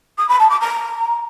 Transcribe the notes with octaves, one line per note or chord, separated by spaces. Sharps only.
D#6
B5
A5
D6
A#5